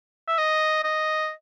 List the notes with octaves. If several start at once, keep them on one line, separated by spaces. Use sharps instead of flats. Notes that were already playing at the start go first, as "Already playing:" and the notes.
E5
D#5
D#5